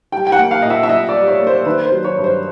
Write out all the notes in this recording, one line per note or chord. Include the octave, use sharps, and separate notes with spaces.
G3 G5
G5
F#5
A#3
F5
A#2 D#5
E5
E5
A#2 D#5
D5
G3
C#5
A#3
C5
D#3 B4
C5
F#3
C#5
G2
C5